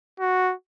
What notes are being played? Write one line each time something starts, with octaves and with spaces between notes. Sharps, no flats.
F#4